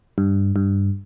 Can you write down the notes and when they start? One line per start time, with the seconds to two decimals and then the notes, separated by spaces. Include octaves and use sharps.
0.18 G2
0.56 G2